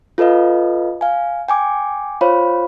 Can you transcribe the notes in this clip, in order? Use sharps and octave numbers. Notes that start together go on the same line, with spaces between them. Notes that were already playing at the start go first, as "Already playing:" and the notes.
F4 A4 B4 D#5 F5
F5 G#5
G5 G#5 D6
F4 C5 C#5 F5 B5